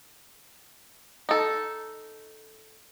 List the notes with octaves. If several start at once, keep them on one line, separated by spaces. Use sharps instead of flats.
D#4 A4